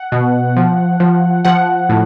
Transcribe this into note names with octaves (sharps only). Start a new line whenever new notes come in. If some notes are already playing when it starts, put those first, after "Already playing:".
Already playing: F#5
B2
F3
F3
F3 F#5
A2